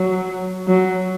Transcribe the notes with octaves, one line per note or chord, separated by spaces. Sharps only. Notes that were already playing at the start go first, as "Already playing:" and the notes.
Already playing: F#3
F#3